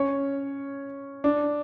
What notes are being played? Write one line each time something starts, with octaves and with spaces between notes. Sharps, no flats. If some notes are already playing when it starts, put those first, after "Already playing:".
Already playing: C#4 C#5
D4